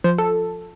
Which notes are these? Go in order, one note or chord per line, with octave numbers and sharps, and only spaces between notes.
F3 C5
A4